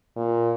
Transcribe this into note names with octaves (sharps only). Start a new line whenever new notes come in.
A#2